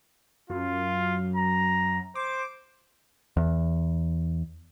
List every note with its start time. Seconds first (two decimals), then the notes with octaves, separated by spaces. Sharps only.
0.50 F#2 F4
1.36 A#5
2.15 C5 D6
3.37 E2